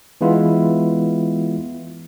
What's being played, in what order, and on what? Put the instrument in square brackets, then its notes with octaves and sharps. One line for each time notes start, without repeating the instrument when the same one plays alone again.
[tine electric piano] E3 G#3 B3 E4 F4